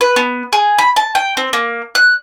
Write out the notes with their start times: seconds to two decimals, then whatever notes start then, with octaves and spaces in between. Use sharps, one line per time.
0.01 B4
0.16 B3
0.53 G#4
0.78 B5
0.96 A5
1.15 G5
1.37 C4
1.53 A#3
1.95 F#6